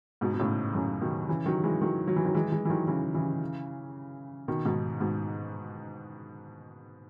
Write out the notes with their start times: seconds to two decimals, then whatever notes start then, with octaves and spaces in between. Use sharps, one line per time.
0.21 G#2 B2
0.33 B2
0.39 A2 C#3
0.75 F#2 A2
1.01 B2 D#3
1.29 C#3 E3
1.46 D#3 F#3
1.64 E3 G#3
1.81 D#3 F#3
2.07 F#3
2.16 E3
2.25 D#3 F#3
2.34 E3 G#3
2.52 E3 G#3
2.65 E3
2.70 D#3 F#3
2.87 C#3 E3
3.15 C#3 E3
4.48 B2 D#3
4.65 G#2 B2
5.00 G#2 B2